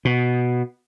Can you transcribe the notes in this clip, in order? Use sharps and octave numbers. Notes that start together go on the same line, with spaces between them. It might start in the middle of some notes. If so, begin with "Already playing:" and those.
B2